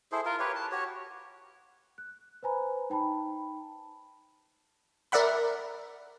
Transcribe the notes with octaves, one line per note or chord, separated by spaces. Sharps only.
E4 G#4 A4 C5
F4 A#4
G4 B4 C#5
A5
F#4 G4 C#5
F#6
B4 C5 G#5 A#5 B5
D#4 G5 A5 B5
A#4 D5 E5 F#5 B5